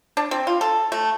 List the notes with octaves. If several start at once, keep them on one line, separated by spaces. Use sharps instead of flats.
D4
C4
F4
A4
A3